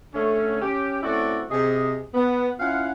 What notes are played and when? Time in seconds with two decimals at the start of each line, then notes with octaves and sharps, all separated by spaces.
0.14 D3 A3 C#4
0.62 C#4 G4
1.03 A3 C4 C#4 E4 F#4 D5
1.50 C3 G#4 D#5
2.14 B3
2.60 C#4 E4 F4 F5 F#5